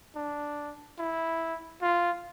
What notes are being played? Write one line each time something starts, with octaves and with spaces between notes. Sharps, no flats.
D4
E4
F4